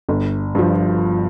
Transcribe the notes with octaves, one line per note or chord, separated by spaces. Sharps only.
G1
G2 F3